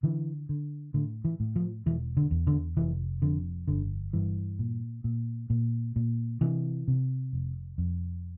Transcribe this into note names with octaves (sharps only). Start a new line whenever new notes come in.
D3 E3
D3
A2 D3
E3
A2
F3
E1 E3
D3
E2
D3
F1 E3
F2 D3
G1 D3
G2 E3
A#2
A#2
A#2
A#2
C3 E3
C3
F1
F2